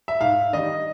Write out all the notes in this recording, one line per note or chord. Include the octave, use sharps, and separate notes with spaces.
E5
G#2 F5
D#3 G3 D#5